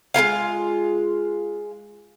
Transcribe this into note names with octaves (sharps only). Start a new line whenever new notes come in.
G#3 E4 F4 F5